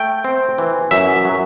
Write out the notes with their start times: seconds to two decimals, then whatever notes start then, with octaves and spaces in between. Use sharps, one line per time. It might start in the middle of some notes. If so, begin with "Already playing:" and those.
Already playing: A3 G5
0.24 C4
0.58 E3
0.91 F#2 E5
1.25 F#3